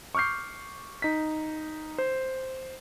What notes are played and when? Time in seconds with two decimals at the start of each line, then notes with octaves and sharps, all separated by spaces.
0.15 C#6 D6 F6 G6 C7
1.02 D#4 B6
1.98 C5